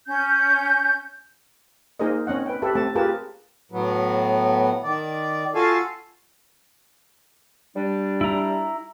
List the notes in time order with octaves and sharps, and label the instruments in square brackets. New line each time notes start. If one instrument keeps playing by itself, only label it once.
[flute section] C#4 G6
[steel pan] A#3 D#4 G#4 A#4 C5 D#5
C4 C#4 D#5 F#5
B4 G5
G4 A4 B4 E5
A3 C4 A5
F4 G4 G#4 A#4 B4 A5
[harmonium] A2 F#3 B3
D#3 D5
F4 F#4 A4 F5 G#5 A5
[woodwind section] G3 D4
[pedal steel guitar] E4 A#5